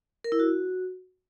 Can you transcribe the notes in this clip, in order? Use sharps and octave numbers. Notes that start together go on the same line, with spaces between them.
A#4
E4
F#4